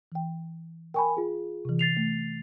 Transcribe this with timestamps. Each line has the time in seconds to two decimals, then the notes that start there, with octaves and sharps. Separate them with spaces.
0.12 E3 G5
0.94 A#4 G5 G#5 B5 C#6
1.17 F4 G#4
1.65 C3 E3
1.79 A6 C7 F7
1.97 A3